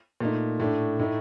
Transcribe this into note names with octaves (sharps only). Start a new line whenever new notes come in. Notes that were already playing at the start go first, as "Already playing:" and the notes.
A#2 A3 D#4
A2 A3 D4
A2 A3 D#4